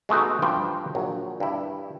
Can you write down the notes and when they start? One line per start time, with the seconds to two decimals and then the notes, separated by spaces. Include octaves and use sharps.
0.09 G#3 A3 B3 D#4 F#4
0.42 G2 F3 G3 C5 G5
0.95 A#1 F#3
1.40 G2 E4